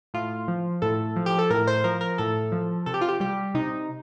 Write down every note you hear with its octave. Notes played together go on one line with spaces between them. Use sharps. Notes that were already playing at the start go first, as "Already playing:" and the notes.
A2 F4
F3
A2 A4
F3
G4
A4
A2 A#4
C5
F3 A#4
A#4
A2 A4
F3
C3 A4
G4
F4
G4
G3 G4
C3 D#4